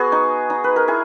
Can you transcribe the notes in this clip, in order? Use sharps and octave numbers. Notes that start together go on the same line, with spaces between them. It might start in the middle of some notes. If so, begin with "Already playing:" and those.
Already playing: B3 F#4 G#4
D#4
D#4
B4
A#4
E4 G#4